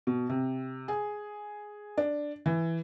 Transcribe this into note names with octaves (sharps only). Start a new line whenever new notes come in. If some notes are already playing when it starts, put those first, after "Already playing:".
B2
C3
G#4
D4
E3